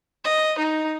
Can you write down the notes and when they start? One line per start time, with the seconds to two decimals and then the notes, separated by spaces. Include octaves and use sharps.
0.25 D#5
0.58 D#4